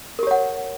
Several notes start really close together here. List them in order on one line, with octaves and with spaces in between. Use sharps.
A#4 G4 C#5 F#5